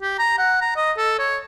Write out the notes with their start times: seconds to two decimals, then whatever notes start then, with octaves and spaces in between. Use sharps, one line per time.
0.02 G4
0.19 A#5
0.39 F#5
0.61 A#5
0.76 D#5
0.98 A4
1.19 C#5